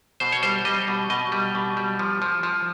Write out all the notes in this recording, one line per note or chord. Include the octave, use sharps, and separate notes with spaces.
B2 C5
C#5
G3 C5
G3 D#5
B2
B2 D#5
G3
B2
G3
F3
F3
F3